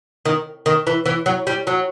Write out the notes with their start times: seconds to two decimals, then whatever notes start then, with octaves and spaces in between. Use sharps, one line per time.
0.25 D#3
0.66 D#3
0.87 E3
1.06 E3
1.26 F#3
1.47 G3
1.67 F#3